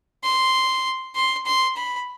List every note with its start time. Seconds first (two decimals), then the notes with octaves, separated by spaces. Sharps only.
0.24 C6
1.15 C6
1.46 C6
1.76 B5